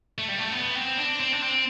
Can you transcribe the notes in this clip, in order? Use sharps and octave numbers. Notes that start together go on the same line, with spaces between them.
A3
G3
A3
B3
C4
D4
C4
D4
C4